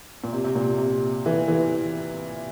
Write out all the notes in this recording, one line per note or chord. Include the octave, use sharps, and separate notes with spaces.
A#2
C3
C3
A#2
C3
E3
E3